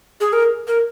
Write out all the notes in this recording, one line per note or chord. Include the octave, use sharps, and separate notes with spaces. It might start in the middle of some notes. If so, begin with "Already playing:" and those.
G#4
A#4
A#4